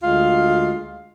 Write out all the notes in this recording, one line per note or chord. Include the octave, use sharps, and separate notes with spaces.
D2 G#3 F4 F5